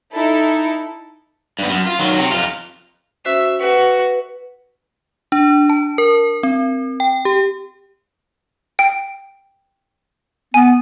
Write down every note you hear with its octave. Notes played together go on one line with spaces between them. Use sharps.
D#4 E4 A4
G2 B3
F#2
F4
D#3 F#3
C3
F2 F4
C#4 F#4 C5 E5
F#4 B4
D4
A5
A#4
C4
G5
G4
G5
B3 G#5